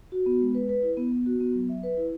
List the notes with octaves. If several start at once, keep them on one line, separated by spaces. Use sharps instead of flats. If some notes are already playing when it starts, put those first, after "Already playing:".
F#4
B3
G#3
B4
B4
E4
B3
B3
F#4
B3
F#3
E5
B4
E4